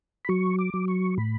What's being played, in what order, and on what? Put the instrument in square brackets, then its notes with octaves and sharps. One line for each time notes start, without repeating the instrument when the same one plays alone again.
[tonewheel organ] B5
F#3 C#6
D6
F#3
C#6
A2 B5